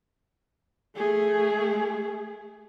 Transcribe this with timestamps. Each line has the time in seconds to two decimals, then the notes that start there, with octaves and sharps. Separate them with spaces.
0.96 A3 G#4